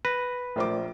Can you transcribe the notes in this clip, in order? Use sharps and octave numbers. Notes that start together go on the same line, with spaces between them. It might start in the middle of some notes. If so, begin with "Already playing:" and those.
B4 A#6
A#1 A3 A#4 C5 D5 D6